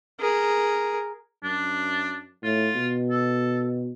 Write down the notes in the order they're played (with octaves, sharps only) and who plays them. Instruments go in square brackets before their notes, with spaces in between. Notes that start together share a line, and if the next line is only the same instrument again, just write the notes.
[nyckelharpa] G#4 A#4
[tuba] F#2 [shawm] D4
[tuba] A2 [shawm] F4
[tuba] B2
[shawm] A4